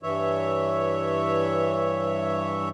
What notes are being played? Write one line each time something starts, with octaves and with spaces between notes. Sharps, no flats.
G2 E3 C#5 E5